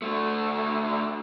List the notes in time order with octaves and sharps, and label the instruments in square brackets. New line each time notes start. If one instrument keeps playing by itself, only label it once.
[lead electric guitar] D3 A3